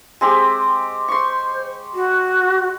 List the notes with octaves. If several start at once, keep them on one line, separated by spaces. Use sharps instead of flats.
G#3 C4 G4
C5 C6 C#6
F#4